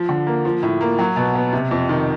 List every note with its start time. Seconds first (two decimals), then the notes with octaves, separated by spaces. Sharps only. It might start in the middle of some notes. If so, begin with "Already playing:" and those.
Already playing: F3
0.09 D3
0.27 A#3
0.45 F3
0.63 A2
0.81 A#3
0.99 F#3
1.16 B2
1.35 B3
1.53 C3
1.71 F2
1.89 D#3